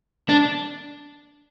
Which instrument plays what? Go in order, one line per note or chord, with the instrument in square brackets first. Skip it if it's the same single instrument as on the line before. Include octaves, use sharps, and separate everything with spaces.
[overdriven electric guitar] D4